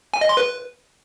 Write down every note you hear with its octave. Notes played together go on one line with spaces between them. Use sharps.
G#5
D#5
C6
B4